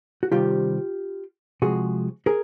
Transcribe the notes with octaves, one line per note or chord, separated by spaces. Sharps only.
F#4
C3 D#3 G3 C4 F4 G4
C3 F3 G#3 F#4 G#4
G#4 A#4